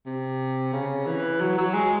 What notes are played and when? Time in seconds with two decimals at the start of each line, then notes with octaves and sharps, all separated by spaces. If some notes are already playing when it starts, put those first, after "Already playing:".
0.06 C3
0.73 C#3
1.06 E3
1.41 F#3
1.58 F#3
1.74 G#3